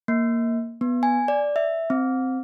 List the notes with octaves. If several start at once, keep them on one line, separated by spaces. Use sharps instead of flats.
A#3
B3
G#5
D5
E5
C4